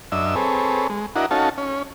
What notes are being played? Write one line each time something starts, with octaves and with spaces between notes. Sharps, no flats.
F#2 D4 D#5 E5 E6
C4 G#4 A4 B4 C#5
G#3
D4 E4 F#4 A#4 D#5 F#5
C#4 D#4 F#4 A4 F5 A5
C#4